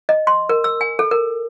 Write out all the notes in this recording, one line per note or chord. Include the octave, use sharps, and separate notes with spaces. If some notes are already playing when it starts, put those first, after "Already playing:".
D#5
C6
A#4
E6
G#5
A4
A#4